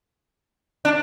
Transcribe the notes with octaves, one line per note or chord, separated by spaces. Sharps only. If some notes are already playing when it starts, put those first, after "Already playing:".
D4